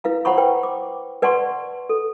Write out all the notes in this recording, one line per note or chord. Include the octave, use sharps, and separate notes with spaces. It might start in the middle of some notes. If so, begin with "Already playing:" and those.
E4 B4 F5 A#5
C5 C#5 F#5 A#5 B5 C#6
B4 G5
D6
B4 D5 F#5 A5 C6 C#6
A4